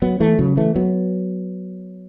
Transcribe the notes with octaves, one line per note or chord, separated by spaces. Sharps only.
F#3 B3
E3 A3
C#3 F#3
E3 A3
F#3 B3